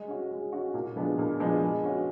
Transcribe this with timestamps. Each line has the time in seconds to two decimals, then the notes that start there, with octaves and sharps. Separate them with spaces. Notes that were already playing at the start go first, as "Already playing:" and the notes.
Already playing: G#3
0.08 C#4 F#4
0.31 G#3
0.52 C#4 F#4
0.74 A#2
0.96 F3 G#3 B3 D4
1.18 A#2
1.40 F3 G#3 B3 D4
1.62 G#3
1.84 C#4 F#4 B4